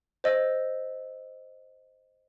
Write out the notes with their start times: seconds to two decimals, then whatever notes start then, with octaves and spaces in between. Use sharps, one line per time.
0.24 C5 D#5 E6